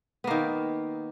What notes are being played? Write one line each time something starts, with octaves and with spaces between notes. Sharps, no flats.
D#3 A#3 B3